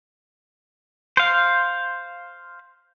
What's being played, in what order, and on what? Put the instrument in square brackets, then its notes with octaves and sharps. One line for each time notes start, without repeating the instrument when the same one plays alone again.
[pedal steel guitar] C5 F5